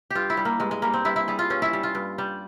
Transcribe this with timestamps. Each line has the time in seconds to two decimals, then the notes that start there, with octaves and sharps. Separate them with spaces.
0.10 G2 F4 G4
0.30 E4
0.37 G3
0.45 A#3
0.60 G2 G#3
0.71 G#3
0.82 G3 A#3
0.93 C4
1.05 G2 E4
1.16 E4
1.28 G3 G#4
1.39 F4
1.50 G2 C#4
1.62 E4
1.73 G3
1.83 F4
1.95 G2
2.18 G3